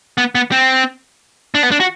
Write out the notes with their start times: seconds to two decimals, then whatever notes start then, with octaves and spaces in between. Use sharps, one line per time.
0.18 B3
0.35 B3
0.52 C4
1.55 D4
1.63 B3
1.71 D4
1.80 F#4